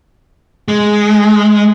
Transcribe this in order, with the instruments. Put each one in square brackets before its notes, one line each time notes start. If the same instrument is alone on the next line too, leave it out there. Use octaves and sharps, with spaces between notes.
[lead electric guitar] G#3